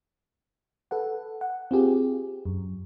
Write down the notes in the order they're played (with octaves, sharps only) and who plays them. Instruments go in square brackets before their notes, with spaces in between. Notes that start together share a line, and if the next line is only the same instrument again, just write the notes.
[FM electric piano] A4 B4 F#5
F#5
C4 F4 G4 G#4
F#2